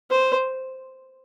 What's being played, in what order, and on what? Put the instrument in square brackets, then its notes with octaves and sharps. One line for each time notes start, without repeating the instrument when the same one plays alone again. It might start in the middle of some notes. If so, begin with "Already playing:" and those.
[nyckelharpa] C5